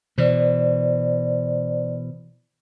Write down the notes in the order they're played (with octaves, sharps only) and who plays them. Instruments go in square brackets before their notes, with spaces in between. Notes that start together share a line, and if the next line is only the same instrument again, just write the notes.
[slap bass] B2 E3 [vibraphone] C5 D5